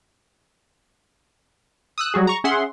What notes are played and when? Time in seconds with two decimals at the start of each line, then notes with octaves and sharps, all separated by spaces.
1.98 D#6 E6 F#6
2.14 F#3 G3 F#4 G#4
2.27 A#5 C#6
2.44 C#4 G#4 E5 F#5 C6